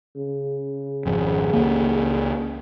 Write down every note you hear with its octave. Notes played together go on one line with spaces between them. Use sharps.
C#3
G#1 F2
C#2 A#3